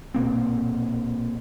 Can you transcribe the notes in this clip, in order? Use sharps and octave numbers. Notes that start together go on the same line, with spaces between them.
A#1 B2 A#3 C4